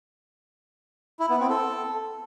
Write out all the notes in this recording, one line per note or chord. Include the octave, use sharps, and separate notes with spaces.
E4
B3
C4
A4